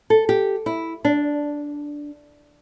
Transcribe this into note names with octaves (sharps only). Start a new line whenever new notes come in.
A4
G4
E4
D4